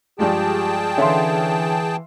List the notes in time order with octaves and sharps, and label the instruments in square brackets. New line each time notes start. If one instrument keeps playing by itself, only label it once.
[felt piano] G2 F3 G#3 [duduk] G4 [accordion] G#4 G5 A5
[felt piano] D3 C#4 [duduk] E3 [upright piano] E5 F5 C6